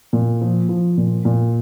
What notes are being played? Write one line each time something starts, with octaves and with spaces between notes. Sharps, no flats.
A#2
F3
F3
A#2
A#2